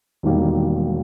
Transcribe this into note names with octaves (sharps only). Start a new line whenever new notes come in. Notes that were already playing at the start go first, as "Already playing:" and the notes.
E1 D#2 D#3 G3 A#3